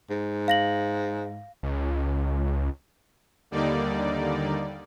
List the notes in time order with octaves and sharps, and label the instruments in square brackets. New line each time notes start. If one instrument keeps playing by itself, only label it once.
[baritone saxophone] G#2
[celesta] F5 A#6 F#7
[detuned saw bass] C#2
[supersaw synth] D#2 D3 G3 A#3 D#4 D5